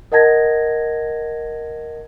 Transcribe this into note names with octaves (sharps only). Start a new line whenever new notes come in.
A#4 D#5 F#5 A5 G#6 A#6